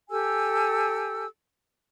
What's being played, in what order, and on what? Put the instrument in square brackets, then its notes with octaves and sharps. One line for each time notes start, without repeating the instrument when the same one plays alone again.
[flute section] G4 A4 G#5 E6